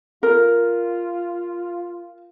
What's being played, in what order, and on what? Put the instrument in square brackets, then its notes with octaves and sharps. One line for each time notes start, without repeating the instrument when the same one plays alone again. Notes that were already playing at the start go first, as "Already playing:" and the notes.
[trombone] F4 [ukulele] A#4